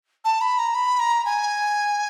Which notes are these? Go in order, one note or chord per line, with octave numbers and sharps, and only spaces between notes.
A5
B5
A#5
B5
A#5
G#5